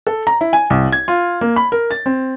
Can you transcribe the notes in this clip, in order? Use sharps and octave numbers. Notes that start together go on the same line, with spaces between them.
A4
A#5
E4
G#5
C2
G#6
F4
A#3
B5
A#4
A6
C4